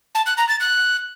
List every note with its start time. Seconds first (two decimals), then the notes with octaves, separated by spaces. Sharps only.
0.15 A5
0.26 F#6
0.37 A#5
0.49 A6
0.60 F#6